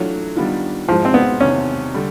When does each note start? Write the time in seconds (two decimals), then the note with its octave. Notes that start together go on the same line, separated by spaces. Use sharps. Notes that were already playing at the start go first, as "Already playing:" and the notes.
Already playing: E3 F#3 A3 D4 F4
0.36 D#3 G3 B3 D4 F4
0.88 G#2 E3 F3 G#3
1.05 C4
1.14 B3
1.40 E2 C3 D#3 C#4
1.94 D3 G3